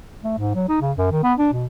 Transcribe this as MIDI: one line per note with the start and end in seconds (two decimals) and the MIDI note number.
0.24 0.34 57
0.38 0.53 44
0.55 0.64 54
0.69 0.78 63
0.81 0.92 49
0.97 1.09 42
1.12 1.22 51
1.24 1.33 59
1.39 1.50 62
1.53 1.66 47